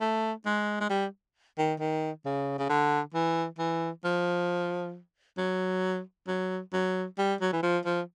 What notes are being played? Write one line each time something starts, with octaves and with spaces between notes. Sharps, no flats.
A3
G#3
G#3
G3
D#3
D#3
C#3
C#3
D3
E3
E3
F3
F#3
F#3
F#3
G3
F#3
E3
F3
F3